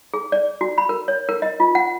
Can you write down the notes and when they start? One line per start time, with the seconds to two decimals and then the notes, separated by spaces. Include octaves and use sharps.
0.14 G#4
0.32 D5
0.61 F#4
0.78 B5
0.89 A#4
1.08 C#5
1.29 A#4
1.42 D#5
1.60 F4
1.75 F#5